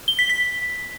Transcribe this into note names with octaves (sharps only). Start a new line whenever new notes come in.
G7
B6
B6